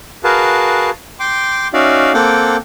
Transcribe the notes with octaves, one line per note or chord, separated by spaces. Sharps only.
F#4 G#4 A#4 B4 F5 A5
G5 C6 D6
C#4 D#4 F#4 D5 E5 F5
A#3 C4 A4 F#5 G5 D6